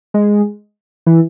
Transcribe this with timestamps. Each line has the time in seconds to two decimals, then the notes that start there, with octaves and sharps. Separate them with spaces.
0.14 G#3
1.06 E3